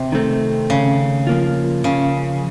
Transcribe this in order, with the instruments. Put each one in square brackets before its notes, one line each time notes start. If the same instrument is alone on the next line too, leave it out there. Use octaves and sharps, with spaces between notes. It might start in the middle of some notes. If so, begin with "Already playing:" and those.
Already playing: [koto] C3
[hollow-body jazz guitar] D#3 A3 C4
[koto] C#3
[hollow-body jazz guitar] F3 A#3 F4
[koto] C#3